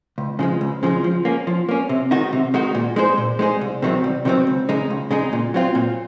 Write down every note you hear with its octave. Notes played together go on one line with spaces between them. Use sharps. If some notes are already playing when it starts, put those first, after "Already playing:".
C#2
C#3 F3 G#3
C#2
C#3 F3 G#3
F3
A#3 C#4
F3
A#3 C#4
C3
D#3 G#3 D#4 F#4
C3
D#3 G#3 D#4 F#4
A#2
G#3 D#4 G#4 C5
A#2
G#3 D#4 G#4 C5
C2
C3 D#3 F#3 C4
C2
C3 D#3 F#3 C4
C#2
C#3 G#3 D#4
C#2
C#3 G#3 D#4
A#2
F#3 C4 F4
A#2